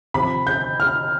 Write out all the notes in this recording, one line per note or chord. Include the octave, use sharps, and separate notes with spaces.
C3 F3 B5
G6
F6